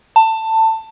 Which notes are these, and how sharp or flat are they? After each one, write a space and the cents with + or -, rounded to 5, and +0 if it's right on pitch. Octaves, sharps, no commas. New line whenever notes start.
A5 +20